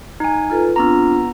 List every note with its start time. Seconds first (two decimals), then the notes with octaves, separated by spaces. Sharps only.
0.20 D#4 G#5
0.50 F4 A4 B4
0.76 B3 C4 D4 F4 A#5